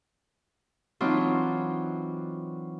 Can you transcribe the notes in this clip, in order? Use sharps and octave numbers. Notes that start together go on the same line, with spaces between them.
E3 F#3 C4 D4 D#4 F4